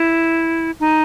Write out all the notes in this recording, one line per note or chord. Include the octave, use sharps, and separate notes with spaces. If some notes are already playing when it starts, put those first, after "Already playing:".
Already playing: E4
D#4